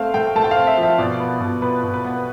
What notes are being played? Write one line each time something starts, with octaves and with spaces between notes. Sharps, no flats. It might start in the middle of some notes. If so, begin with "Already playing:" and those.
Already playing: A3 C4 F5
A3 G5
A3 A5
G5
F5
C4
E5
F3
E5
B2 D5
B3
B2
B3 B4
B2
B4
B3